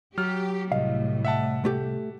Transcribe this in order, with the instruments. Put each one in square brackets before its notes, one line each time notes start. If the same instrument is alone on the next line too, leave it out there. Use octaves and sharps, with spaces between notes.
[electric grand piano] F#3 F6 [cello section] G4
[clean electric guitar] C2 D#5 [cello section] A2 [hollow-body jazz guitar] F5
[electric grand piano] E5 F#5 A5
[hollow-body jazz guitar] A3 G4